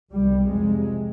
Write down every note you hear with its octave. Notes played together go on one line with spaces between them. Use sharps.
C2 G3
B2
F2 C3 G#3